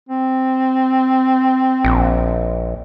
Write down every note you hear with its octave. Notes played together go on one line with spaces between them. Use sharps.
C4
A#1